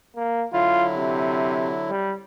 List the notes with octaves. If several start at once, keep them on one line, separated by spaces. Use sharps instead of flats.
A#3
D3 F#3 E4 F4
C3
G3